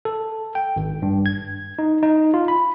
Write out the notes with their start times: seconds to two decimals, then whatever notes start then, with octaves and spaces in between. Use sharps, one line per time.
0.05 A4
0.55 G5
0.76 G#1
1.02 G2
1.26 G#6
1.79 D#4
2.03 D#4
2.34 F4
2.48 B5